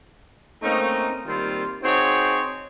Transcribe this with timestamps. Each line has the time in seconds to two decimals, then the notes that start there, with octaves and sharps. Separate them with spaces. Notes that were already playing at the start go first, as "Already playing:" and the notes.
0.63 A3 A#3 C4 C#4 D#4
1.26 D#3 G3 A#3 C4 F4
1.83 C4 D#4 F#4 G#4 C5 C#5